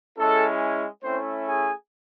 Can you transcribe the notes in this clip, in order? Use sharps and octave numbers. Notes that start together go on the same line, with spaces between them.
G#3 C#4 E4 A4
A3 C4 C#4 E4 C5
G#4 G#5